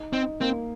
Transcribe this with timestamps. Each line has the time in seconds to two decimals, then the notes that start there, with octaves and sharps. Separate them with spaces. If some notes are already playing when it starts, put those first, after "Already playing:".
Already playing: D#4
0.13 C4 D#4
0.41 A#3 C4